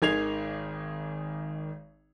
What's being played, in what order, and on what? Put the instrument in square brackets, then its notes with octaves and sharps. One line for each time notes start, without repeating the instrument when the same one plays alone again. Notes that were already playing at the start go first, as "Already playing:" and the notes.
[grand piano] G#1 D#3 G#4 G#6 C7 F7